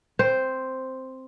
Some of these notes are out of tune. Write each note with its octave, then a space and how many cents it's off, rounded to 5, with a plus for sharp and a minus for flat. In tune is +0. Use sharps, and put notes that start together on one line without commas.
C4 +0 C5 +0